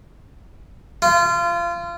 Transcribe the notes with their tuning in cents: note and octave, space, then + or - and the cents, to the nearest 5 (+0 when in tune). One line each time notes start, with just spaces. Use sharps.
F4 -25